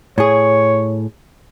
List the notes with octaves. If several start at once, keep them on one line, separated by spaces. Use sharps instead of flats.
A2 G#4 C#5